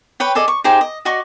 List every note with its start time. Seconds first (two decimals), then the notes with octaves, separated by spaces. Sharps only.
0.20 B4 C#5 G5
0.35 G#4 A4 D5 D#5
0.48 C#6
0.64 D#4 G4 G#4 C5
0.81 D#5
1.05 F#4 D5 D#5 C#6